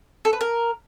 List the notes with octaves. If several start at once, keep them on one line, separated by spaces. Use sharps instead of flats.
A4
B4
A#4